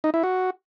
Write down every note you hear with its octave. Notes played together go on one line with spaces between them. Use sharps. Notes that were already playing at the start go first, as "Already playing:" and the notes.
D#4
E4
F#4